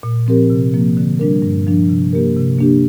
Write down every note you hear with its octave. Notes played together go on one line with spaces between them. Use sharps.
A#2
F3 C4 G4 A#4
C3
F3 A#3
D3
G3 D4 A#4
G2
F3 D4
C3
A#3 G4 A#4
C3
A#3 D4 G4